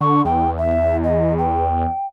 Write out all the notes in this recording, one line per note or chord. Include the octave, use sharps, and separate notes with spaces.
D3 C#6
E2 G5
E5
D#5
G5